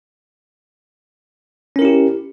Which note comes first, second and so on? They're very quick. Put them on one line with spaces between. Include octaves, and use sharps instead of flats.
C#4 A#4 E4 G4